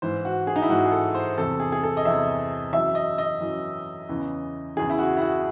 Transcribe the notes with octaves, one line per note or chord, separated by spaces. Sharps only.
G#2 E3 C5
F#4
G#4
D#4
E4
G#2 E3 F#4
G#4
A4
C5
E2 C3 E3 A4
G#4
G#4
A4
D#5
E2 C3 E3 E5
F#2 E3 E5
D#5
D#5
F#2 E3
E2 C#3 E3
E2 C#3 E3 G#4
E4
F#4
E4
F#4